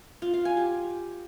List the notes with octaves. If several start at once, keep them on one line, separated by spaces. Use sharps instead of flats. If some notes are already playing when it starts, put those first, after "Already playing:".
F4
F5
G#5
G4